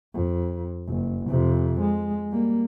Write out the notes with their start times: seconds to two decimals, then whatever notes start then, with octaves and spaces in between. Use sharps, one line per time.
0.15 F2
0.88 F#1
1.28 F2 C3
1.80 G#3
2.31 G3 A#3